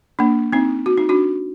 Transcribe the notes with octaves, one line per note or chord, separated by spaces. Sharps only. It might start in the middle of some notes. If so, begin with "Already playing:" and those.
A#3 D4
C4 D#4
F#4
D#4
D4 F#4